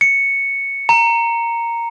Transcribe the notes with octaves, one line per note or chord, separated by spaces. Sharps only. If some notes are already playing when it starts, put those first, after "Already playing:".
C#7
A#5